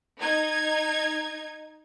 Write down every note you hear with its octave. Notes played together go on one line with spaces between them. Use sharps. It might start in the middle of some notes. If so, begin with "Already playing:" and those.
D#4 G#6